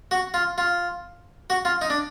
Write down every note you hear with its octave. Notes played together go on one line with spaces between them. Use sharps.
F#4
F4
F4
F#4
F4
D#4
D4